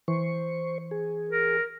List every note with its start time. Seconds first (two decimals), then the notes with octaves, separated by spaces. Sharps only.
0.08 E3 C5 C#6
0.91 G#4
1.29 A#4